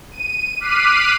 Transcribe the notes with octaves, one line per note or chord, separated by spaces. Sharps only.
D#7
D6 F6 F#6 B6 C7 D#7